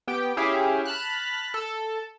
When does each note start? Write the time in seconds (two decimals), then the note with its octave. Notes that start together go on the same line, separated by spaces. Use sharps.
0.07 B3 G4 G5
0.37 C#4 E4 G4 G#4 E5 F5
0.85 A5 B5 F6 F#6
1.54 A4